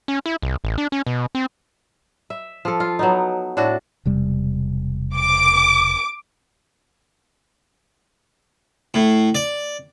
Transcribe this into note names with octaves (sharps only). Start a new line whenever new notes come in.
C#4
E4
C2
A1
D4
C#4
B2
C4
E5
F3 A4
F4
F#3 B3 D#4
A2 D4 F#4 A4
E1 C3 G3
D6
A2
D5